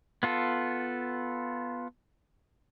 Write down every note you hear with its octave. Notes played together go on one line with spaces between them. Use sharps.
B3 F4 A4